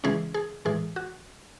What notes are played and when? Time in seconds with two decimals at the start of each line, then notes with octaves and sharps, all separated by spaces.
0.04 C#3 E3 G#3 C#4 G#4
0.34 G#4
0.65 A2 E3 G#3 G#4
0.96 F#4